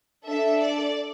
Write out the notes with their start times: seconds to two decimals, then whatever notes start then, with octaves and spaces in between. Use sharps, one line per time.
0.24 D4 A4 E5
0.58 D5